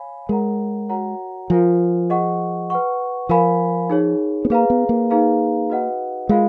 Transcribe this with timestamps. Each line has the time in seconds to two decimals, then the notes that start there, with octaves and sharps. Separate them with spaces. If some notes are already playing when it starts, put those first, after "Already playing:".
Already playing: C#5 F5 G#5 B5
0.29 G#3 A#4 C#5 F#5 A#5
0.89 F#4 C#5 F#5 A#5
1.50 F3 F4 A#4 F5 G#5
2.10 G#4 D#5 F#5 C#6
2.70 B4 F#5 C#6
3.29 F3 A#4 F5 G#5 B5
3.90 D#4 G#4 C#5
4.45 B3
4.50 A#3 G#4 B4 F5 A#5
4.70 B3
4.89 A#3
5.10 D#4 G#4 B4 F5 A#5
5.70 F#4 B4 D#5 F#5
6.29 G#3 F4 A#4 F5 B5